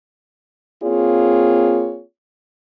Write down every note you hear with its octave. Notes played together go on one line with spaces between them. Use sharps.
A#3 C4 F4 G#4 C#5